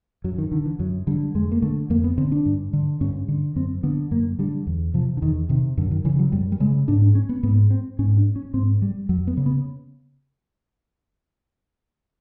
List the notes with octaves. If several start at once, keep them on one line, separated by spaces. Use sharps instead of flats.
F#2 F#3
D#3
D3 D#3
E3
F#2 F#3
D3 G3
F2 G#3
A#3
D3 A3
F2 A#3
B3
D3 C4
D4
G2
D3
G2 C#4
D3
F#2 C4
D3 B3
F#2 A#3
D3 G3
E2
C3 F3
D3
E2 D#3
C3 D#3
F#2 D3
D#3
C#3 E3
F#3
F#2 G3
G3
C#3 G#3
G#2 D4
D4
C#4
B3
G#2 B3
C4
G#2 C#4
D4
C#4
G#2 C4
G3
F2 F#3
B3
C#3
B3